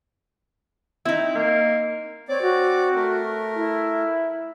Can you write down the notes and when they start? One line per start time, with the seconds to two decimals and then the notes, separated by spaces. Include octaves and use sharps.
1.06 C4 D#4 E4
1.35 A#3
2.29 C4 C#5 D5 D6
2.42 F#4
2.95 A3 A#4
3.55 E4